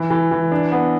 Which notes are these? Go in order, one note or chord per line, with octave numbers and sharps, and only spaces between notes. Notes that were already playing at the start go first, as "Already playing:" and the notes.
Already playing: E3
E3
E3
D4
B3